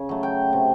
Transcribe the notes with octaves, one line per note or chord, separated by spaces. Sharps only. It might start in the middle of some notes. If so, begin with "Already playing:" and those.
Already playing: C#3 C#5
F#3 A3
G5
C3